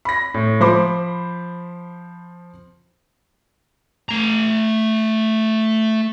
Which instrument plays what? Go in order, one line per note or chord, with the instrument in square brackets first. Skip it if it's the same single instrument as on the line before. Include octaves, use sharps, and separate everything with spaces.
[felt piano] B5 A#6
A2
F3 C5 B5 D6
[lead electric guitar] A3 A#5